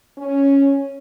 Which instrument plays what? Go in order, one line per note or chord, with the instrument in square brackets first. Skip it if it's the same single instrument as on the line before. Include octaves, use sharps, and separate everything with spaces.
[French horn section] C#4